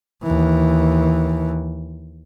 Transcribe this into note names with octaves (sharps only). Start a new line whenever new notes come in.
D#2 E3